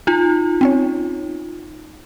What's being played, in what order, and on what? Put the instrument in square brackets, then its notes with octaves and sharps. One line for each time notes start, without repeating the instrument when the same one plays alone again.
[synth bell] D#4 F4
[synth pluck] C4 C#4 C#5